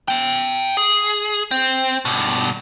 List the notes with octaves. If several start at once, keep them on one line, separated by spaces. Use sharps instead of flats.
E5 G5
G#4
C4
G2 B2